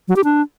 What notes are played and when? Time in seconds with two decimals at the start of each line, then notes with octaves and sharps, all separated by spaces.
0.08 F#3
0.16 G4
0.24 D4